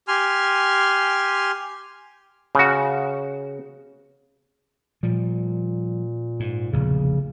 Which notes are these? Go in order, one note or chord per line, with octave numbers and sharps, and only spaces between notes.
G4 G#5 C6 F6
C#3 F#4
A#2 F3 G3
G#2
F1 A#1 E2 C#3